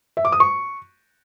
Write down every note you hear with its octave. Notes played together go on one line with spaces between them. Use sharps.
E5
D6
D#6
C#6